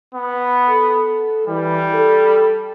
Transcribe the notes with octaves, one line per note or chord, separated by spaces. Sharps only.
B3
A4
E3 G3
A4